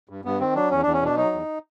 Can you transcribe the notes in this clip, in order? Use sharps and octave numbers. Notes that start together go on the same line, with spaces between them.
G2
G2 B3
D#3 C4
F#3 D4
E2 C#4
E2 D4
C#4
B2 D4
F#3 D#4
E2